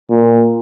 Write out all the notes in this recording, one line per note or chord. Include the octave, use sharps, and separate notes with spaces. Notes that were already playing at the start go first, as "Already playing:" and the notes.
A#2